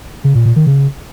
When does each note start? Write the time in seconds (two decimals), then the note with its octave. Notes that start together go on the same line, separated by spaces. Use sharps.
0.24 C#3
0.35 A#2
0.45 A#2
0.56 D#3
0.67 C#3